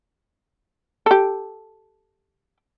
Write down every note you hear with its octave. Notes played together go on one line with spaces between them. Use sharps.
G4 A4